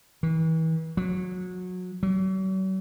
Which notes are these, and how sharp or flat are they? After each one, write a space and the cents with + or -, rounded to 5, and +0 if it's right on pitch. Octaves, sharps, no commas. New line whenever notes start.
E3 -35
F#3 -25
F#3 +45